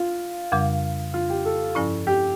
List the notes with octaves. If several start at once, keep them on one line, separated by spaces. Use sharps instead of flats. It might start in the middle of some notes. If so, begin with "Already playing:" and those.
Already playing: F4
F2 C#3 G3
F4
G4
A4
G2 F3 C#4 E4
G4